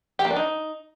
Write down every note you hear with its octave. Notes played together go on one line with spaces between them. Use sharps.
G4
A#3
D4
D#4